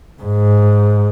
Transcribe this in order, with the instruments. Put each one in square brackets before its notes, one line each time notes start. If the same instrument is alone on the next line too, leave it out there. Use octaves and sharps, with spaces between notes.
[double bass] G#2